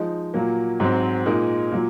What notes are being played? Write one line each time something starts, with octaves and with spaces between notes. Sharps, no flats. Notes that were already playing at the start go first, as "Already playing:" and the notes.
Already playing: F3 G#3 D#4
A#2 F#3 A#3
G#2 F#3 C4
A#2 G#3 D#4 A#4
A#2 F#3